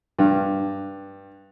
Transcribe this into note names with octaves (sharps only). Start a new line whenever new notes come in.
G2